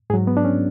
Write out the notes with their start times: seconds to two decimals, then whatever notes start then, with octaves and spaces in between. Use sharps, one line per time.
0.10 G#2 G#4
0.14 F#3
0.27 B3
0.37 D4
0.45 C#4